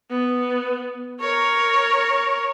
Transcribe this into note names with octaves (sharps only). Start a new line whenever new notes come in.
B3
A#4 C#5